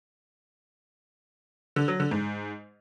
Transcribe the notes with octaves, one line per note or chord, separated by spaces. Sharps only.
D3
F#3
D3
G#2